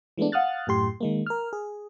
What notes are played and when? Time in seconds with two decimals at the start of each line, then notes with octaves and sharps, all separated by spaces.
0.18 E3 G#3 A3 B3 D4
0.32 F5 F#5 D#6 F6 F#6 A6
0.67 F#2 A2 G4 C6
1.00 D#3 G#3 A#3
1.26 A#4 F6
1.53 G#4